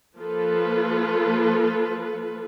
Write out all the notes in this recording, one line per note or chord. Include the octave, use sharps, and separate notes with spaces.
F3 A#3 F4 A4 B4